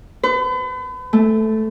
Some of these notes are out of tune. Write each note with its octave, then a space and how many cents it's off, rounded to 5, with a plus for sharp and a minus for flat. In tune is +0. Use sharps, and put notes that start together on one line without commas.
B4 +40
A3 -5